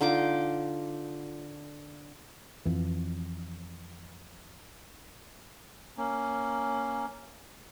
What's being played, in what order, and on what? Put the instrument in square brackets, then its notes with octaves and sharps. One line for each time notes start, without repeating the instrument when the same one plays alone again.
[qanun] D3 D#4 F4 D6
[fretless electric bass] F2 E3
[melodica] A#3 C#4